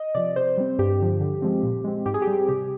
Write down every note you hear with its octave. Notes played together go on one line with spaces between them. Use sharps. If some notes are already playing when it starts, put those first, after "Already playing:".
Already playing: D#5
C3 F3 D5
C3 C5
G3 C4
G2 G4
D3 F3
D3
F3 G#3 C4
A#2
G#3 C4
G#2 G4
G#4
G4
G3 C4
C3 G4